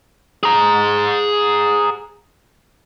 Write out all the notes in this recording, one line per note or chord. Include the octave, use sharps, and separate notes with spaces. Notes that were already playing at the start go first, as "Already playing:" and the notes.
G#4 A#5